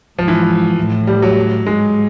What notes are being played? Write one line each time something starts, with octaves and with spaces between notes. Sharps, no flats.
G#2 F3
E3
A2
G3
F#3
G#2 G#3